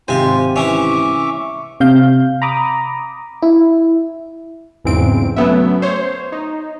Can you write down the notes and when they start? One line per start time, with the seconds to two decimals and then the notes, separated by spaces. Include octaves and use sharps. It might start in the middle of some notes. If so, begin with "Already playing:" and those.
0.08 G#1 C3 C4 F4 G4 C5 G#5
0.56 E3 C#4 E5 C#6 D6
1.80 C3 F5 G6
2.42 A#5 B5 D6 D#6
3.42 E4
4.84 B1 E2 G#2 C#3 C4 D7
5.36 F#3 A3 B3 C#4 E5
5.82 C5 C#5
6.32 D#4